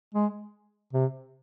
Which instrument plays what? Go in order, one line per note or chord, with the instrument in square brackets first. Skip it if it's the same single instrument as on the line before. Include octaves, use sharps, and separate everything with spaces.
[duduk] G#3
C3